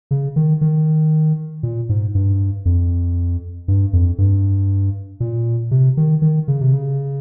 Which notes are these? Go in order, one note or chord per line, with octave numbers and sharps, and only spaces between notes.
C#3
D#3
D#3
A#2
G#2
G2
F2
G2
F2
G2
A#2
C3
D#3
D#3
C#3
C3
C#3